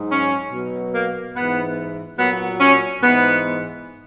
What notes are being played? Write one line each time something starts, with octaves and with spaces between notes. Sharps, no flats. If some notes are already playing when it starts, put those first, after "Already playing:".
Already playing: G#2 F#3
C#4
B2 F#3
A#3
G#2 E3 B3
A#2 F#3 B3
C#4
G#2 E3 B3